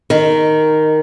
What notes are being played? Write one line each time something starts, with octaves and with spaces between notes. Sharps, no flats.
D#3